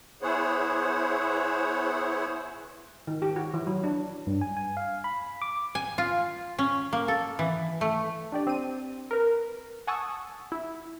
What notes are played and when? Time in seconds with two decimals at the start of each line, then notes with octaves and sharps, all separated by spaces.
0.22 B3 E4 G#4 C5 C#5 F#5
3.07 D#3
3.22 G4
3.36 F#4
3.54 E3
3.67 F#3
3.84 D4
4.27 G2
4.41 G#5
4.57 G#5
4.77 F5
5.04 B5
5.42 D6
5.75 G#5
5.98 F4
6.59 C#4
6.93 A#3
7.08 A4
7.39 E3
7.81 A3
8.32 D4 G4 D5
8.47 C4 D#7
9.11 A#4 B4
9.87 F#5 G#5 A5 C#6 D#6 E6
10.52 E4